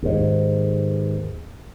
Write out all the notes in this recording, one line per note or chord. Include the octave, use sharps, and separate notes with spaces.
D#2 G#2